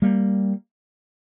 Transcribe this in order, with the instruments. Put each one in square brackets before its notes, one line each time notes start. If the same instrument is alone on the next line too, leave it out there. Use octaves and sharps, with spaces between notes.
[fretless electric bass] G3 A#3